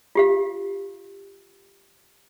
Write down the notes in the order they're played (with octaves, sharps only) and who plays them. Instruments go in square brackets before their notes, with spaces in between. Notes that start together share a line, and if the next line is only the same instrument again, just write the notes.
[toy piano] F4 G4 F5